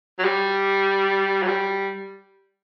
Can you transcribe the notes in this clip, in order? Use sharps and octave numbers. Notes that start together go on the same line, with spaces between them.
F#3
G3
F#3
G3